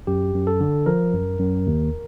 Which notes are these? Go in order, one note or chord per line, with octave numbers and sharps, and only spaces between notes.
F#2 G4
F#2
A4
D3
F3 A#4
F#2
F#2
D#2